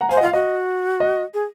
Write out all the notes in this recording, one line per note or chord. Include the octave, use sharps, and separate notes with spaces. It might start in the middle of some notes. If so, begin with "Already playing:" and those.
F#5 A#5
C5 F5 G#5
D#5 F#5
F4 F5
F#4 D#5
D#5
G#4